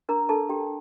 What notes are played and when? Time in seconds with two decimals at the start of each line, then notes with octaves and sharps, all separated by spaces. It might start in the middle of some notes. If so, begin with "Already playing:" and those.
0.09 D4 A#4 A#5
0.29 D4 A4 A5
0.49 D4 G4 G5